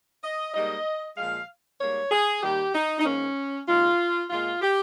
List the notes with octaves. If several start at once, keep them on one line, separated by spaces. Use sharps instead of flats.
D#5
G#2 G3 A#3 D#5
A#2 F3 G#3 F5
G#2 G3 A#3 C#5
G#4
D#2 D#3 G3 G4
D#4
D#4
G#2 D#3 A#3 C#4
D#2 C#3 G#3 F4
A#2 G#3 F4
G4